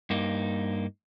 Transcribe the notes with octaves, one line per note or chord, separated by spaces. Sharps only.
G2 A#3 D#4